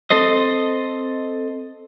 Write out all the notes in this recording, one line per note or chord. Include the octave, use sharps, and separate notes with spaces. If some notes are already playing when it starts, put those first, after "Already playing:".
C4 A4 C5 D#5